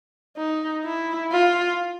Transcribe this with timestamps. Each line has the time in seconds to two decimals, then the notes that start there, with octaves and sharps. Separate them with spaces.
0.37 D#4
0.85 E4
1.32 F4